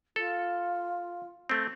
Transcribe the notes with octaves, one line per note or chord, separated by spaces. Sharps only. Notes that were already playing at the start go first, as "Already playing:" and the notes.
F4 A4
A3 C4